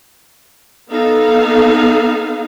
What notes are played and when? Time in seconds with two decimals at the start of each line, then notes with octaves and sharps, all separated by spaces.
0.91 B3 D#4 A4 F5